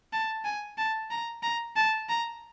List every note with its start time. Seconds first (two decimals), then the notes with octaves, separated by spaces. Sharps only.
0.13 A5
0.45 G#5
0.78 A5
1.11 A#5
1.43 A#5
1.76 A5
2.09 A#5